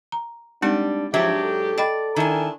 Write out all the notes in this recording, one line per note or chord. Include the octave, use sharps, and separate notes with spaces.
A#5
G3 G#3 C4 D4 D#4
G#2 F3 F#3 D4 G4 E5
A4
D5 D#5 G5 B5
D#3 D4 E4 A#4 G#5